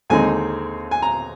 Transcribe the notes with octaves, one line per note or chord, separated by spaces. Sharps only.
D#2 D3 G#3 C4 D#4 G#5
G#5
A#5